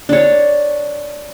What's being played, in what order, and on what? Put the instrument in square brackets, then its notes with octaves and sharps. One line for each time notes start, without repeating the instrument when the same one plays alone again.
[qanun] D4 C#5